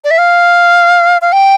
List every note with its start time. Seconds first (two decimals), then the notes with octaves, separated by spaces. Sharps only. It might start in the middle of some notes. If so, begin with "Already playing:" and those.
0.04 D5
0.11 E5
0.18 F5
1.21 F5
1.32 G5